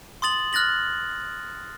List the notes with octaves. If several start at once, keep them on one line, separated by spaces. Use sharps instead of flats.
C6 D#6 A6 F#7
F6 F#6 A6 A#6 F#7